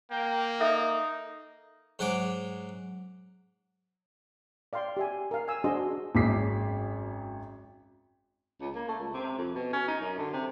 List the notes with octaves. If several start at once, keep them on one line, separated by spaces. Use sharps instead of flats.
A#3 G5
D#4 A4 E5
G#2 F#3 F#5 G#5 D6
D5 F5 G5 C6
G4 E5 G#5
A#4 F5
G#5 E6
D4 F#4 G#4 C5 D#5 C6
G#1 F#2 G#4 D6 B6 C7
C#2
A#3
A3
C#2
C3
F2
B2
C#4
D#4
F#2
D3
C3